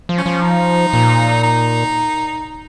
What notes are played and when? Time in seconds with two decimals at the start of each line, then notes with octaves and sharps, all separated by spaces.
0.09 F3
0.18 C#4
0.26 F3
0.42 D#4
0.93 A#2
1.43 D#4